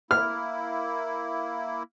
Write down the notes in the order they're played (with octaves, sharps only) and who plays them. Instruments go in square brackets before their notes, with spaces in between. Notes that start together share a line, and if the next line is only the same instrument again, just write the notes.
[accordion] A#3 E4 [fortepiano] F6